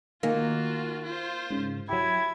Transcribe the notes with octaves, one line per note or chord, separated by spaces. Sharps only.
D#3 A#3 F4 F#4 G#5
F4 C5
G#2 C#3
F#3 E4 G4 G#6